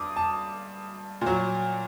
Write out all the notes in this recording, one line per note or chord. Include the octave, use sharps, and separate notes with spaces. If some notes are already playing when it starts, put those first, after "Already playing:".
Already playing: G2 D6 D#6
A5
A#2 F#3